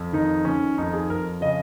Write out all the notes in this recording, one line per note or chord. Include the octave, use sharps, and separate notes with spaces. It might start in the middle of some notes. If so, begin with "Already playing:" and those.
Already playing: F2
D#3 D#4
D#3 C#4
F2 D#4
G#4
F2 A#4
C#3 D#5